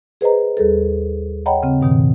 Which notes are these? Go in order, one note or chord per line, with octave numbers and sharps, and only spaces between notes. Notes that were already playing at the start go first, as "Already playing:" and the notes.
G#4 B4 C5 D#5 A#5
D#2 G3 G#4 A4
C#5 D#5 F#5 G5 A#5 B5
C#3 C4
G2 B2 D#3